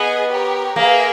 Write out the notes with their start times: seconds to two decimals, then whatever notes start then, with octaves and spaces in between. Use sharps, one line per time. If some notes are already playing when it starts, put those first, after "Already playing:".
Already playing: B3 G#4 D#5 G#5
0.30 G4 A#4 C#5
0.76 A#3 G#4 B4 E5 G5